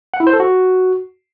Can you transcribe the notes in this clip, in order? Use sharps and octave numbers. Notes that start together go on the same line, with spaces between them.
F#5
E4
C5
A4
F#4